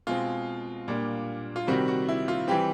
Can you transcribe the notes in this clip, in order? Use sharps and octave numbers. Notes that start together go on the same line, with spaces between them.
B2 G#3 C4 F4
A#2 G3 A#3 D4
F4
C3 D#3 G3 C4 F#4
F#4
E4
F4
E3 G3 C4 G4